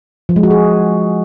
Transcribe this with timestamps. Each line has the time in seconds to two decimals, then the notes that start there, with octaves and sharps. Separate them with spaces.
0.29 F3
0.36 G#3
0.43 F#4
0.51 G#4